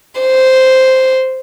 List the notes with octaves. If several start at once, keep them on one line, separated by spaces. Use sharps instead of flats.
C5